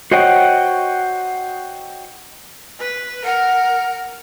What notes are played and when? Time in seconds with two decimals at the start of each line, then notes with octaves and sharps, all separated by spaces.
0.11 F#4 C5 C#5 D#5 F#5 G5
2.80 B4
3.25 A#4 F#5